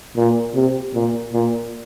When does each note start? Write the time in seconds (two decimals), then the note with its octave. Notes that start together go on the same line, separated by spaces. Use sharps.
0.17 A#2
0.55 C3
0.94 A#2
1.33 A#2